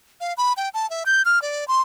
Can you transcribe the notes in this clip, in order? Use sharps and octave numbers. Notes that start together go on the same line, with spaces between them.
F5
B5
G5
A5
E5
G6
F6
D5
C6